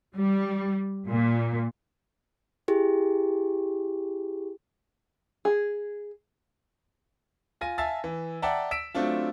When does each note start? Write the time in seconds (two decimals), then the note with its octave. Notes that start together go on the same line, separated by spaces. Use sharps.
0.15 G3
1.07 A#2
2.68 E4 G4 G#4
5.45 G#4
7.61 F4 G#5 A#6 D#7
7.78 E5 F5 G#5 A5 E6 A6
8.04 E3
8.42 D5 E5 F#5 G5 A5 A#5
8.71 E6 B6 D7 E7
8.95 F#3 A3 C4 D4 F4